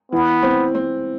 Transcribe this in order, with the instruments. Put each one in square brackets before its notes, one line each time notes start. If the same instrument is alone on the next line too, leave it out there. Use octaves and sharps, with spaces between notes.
[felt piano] E3 [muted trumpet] B3
[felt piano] C4
C4